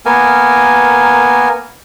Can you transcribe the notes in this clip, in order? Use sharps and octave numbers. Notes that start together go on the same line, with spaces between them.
A#3 B3 A#4 G#5